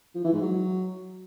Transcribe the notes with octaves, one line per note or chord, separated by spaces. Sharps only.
F3
E3
G#2
F#3